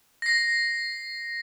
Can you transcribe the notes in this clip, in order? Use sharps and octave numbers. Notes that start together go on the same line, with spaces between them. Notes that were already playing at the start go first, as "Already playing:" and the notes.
A#6 C7